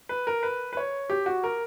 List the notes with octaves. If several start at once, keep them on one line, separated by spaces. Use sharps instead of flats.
B4
A#4
B4
B4
C#5
G4
F#4
A#4